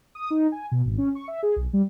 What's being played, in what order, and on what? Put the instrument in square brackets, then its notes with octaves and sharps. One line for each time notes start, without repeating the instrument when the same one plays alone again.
[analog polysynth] D#6
D#4
G#5
B2
G#1
C#4
C#6
E5
G#4
B1
G3